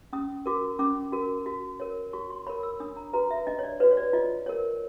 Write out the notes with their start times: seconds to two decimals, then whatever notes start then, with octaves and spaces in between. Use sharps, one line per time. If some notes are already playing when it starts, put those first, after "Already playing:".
0.13 C#4 D#6
0.46 F#4 A#4 D6
0.79 C#4 D6
1.12 F#4 A#4
1.46 F#4
1.80 A#4 C#5
2.13 F#4 C#6
2.30 C6
2.47 A#4 C#5 B5
2.63 E6
2.80 D4 D#6
2.96 A#5
3.13 F#4 B4 A#5
3.31 E5
3.47 D4 D#5
3.59 C#5
3.63 D5
3.80 F#4 B4 C#5
3.91 C#5
3.97 D5
4.13 F4 D#5
4.46 A#4 C#5